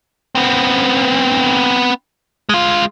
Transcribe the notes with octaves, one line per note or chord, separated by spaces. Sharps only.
B3 C4
G#3 F4